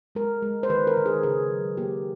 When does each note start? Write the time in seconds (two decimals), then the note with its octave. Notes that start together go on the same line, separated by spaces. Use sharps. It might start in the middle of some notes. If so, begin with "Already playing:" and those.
0.15 G#3 A#4
0.42 G#3
0.63 C5
0.70 D#3 B4
0.87 A#4
0.97 D#3
1.06 G#4
1.23 C#3 G#4
1.51 F#3
1.77 A#3 G4